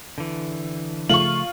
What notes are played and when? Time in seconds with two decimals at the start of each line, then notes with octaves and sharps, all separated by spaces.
0.18 D3 E3
1.09 C#3 F3 A3 F4 C#6 F#7